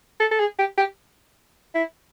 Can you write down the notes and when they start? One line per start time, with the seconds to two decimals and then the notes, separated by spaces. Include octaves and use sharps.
0.20 A4
0.31 A4
0.39 G#4
0.59 G4
0.78 G4
1.75 E4